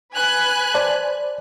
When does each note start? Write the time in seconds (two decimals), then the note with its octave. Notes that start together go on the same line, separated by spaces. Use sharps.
0.13 B4 G#5 F#6
0.74 C5 D5 A5